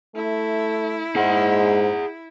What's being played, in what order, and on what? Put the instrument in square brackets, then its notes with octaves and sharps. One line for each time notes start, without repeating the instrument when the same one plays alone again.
[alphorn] A3 [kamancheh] E4
[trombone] G#2 [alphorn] G#3 [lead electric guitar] G#4 F#5